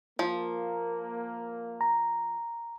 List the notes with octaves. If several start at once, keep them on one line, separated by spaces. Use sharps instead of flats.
F3 A#3
A#5